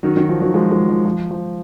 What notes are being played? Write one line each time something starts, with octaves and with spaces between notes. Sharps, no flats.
D#3 F#3
D#3 F#3
F3
D#3 F#3
F3 G#3
F3 G#3
F3
F3
F3